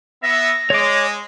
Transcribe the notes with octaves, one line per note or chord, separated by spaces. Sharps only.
B3 E5 A#6
G#3 C#5 D6